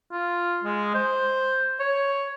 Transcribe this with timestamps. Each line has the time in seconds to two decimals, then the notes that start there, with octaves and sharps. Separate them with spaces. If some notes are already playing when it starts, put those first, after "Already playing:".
0.12 F4
0.64 G#3
0.94 C5
1.80 C#5